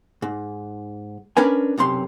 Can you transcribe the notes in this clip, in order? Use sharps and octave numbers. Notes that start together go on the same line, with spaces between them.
G#2
C#4 D4 A#4 B4 G#5
B1 F#2 C3 C6